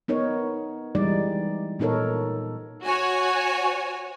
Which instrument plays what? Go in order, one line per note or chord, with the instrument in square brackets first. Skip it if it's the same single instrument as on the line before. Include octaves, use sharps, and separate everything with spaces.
[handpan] B3 D#4 A#4 C#5
E3 G3 G#3 D#4 D5
A#2 B3 D#4 A4 A#4 C#5
[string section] F#4 C#5 G#5